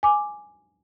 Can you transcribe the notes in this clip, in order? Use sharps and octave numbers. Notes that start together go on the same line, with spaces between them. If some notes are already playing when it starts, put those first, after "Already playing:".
G#5 D6